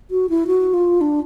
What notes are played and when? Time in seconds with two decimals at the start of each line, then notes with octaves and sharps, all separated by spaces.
0.11 F#4
0.30 E4
0.47 F#4
0.74 F4
1.01 D4